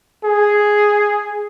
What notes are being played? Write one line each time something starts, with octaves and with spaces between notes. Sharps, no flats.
G#4